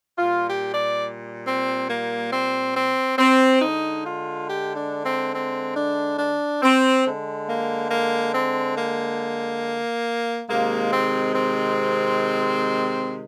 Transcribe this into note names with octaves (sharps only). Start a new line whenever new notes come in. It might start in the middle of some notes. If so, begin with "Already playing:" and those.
A#2 G3 F4
G4
D5
C4
A#3
C4
C4
C4
D3 G#3 D#4
F4
G4
D4
C4
C4
D4
D4
C4
D3 G#3
A#3
A#3
C4
A#3
C3 D#3 G#3 A#3
C4
C4